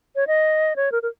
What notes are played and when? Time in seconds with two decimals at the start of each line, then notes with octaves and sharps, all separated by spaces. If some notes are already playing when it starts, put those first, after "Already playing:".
0.16 C#5
0.27 D#5
0.76 C#5
0.92 A#4
1.03 A#4